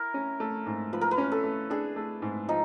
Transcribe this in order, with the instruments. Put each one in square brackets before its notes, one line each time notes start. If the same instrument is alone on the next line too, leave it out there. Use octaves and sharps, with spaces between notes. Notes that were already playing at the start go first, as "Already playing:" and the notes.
Already playing: [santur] E4 A#4
[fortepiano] C#4
A3
G#2
[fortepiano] F3 [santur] B4
[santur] A#4
B4
[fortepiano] C#4
[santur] A4
[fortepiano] A3
[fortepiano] D4 [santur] G#4
[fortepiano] A3
G#2
[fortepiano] F3 [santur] D#4